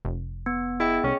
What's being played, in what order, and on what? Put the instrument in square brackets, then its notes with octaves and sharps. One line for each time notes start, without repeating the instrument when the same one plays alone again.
[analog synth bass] F1
[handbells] B3
[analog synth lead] E4 [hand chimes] G#4 D#5 G5
[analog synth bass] C2 [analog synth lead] C#4